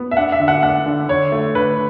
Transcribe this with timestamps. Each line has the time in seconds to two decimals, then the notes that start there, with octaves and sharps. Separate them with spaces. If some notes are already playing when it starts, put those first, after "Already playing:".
Already playing: B3
0.11 E5
0.17 D4 F#5
0.32 E5
0.40 D3
0.48 F#5
0.63 D4 F#5
0.86 D3
1.09 D3 C#5
1.32 A3
1.55 D3 B4